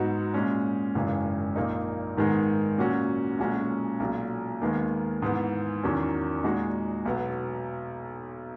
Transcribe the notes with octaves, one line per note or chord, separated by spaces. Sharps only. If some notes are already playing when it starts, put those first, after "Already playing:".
Already playing: G#2 F#3 B3 D#4 F#4
A#2 G#3 C#4
G#1 F#2 C#3 E3 G#3
A#1 A#2 A#3 D#4
G#2 D#3 G#3 B3
A#2 F#3 C#4 F#4
B1 A#2 G#3 C#4 F#4
B1 A#2 F#3
D#2 D#3 G#3 B3
G#2 E3 B3
E2 D#3 F#3 C#4
A#2 G#3 D#4 F#4
B1 B2 F#3 B3